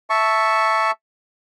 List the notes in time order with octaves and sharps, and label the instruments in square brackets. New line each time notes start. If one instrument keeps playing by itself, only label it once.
[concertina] E5 A5 C#6